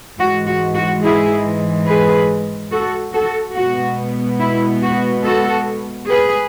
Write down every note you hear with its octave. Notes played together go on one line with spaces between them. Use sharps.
G#2 E3 G#3 F#4
F#4
F#4
E4 G#4
G#4 B4
F#4 A4
F#4 A4
B2 G#3 B3 F#4
E4
F#4
F#4 A4
G#4 B4